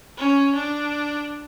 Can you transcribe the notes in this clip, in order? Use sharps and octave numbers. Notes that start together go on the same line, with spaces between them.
C#4
D4